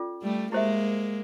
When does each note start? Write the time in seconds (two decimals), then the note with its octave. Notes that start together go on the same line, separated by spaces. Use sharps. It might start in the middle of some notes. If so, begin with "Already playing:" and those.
Already playing: C#4 F4 A4 D5
0.22 G3 A3
0.52 G#3 A#3 E4 G4 C5 E5